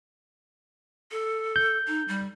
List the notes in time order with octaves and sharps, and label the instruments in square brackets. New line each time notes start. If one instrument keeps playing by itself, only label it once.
[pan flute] A4
[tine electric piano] G6
[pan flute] D#4
G3